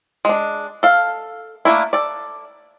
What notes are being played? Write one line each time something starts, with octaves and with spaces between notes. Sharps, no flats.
G#3 D4
A4 F5
A3 A#3 D4 E4
A4 D5